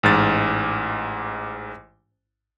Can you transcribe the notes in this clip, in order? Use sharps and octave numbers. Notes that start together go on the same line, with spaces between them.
A1 G#2 A6